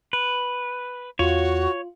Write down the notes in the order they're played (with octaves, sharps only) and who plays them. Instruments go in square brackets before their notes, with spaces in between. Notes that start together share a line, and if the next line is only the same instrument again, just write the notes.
[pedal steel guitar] B4
[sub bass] E2 [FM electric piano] F4 [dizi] F#4 [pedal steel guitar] C#5